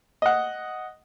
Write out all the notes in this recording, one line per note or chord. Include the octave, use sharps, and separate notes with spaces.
D#5 F#5